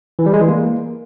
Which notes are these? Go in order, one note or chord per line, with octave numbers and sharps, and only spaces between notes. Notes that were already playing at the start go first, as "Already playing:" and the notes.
E3
G3
G#3
E3
A#3